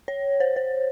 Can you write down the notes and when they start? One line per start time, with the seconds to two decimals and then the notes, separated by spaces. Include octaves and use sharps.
0.08 C#5
0.40 C5
0.56 C5